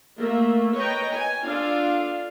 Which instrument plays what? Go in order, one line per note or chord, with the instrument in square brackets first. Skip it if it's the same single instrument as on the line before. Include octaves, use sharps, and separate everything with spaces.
[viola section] A3 A#3 E5
B4 C#5 D#5 G5 A#5
G#5
D4 F4 A4 F5